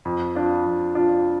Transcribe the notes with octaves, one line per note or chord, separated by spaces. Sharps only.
F2
F3 D4 F4
F2
F3 D4 F4